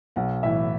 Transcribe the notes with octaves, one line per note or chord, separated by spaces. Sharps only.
B1 F#5
A2 E3 E5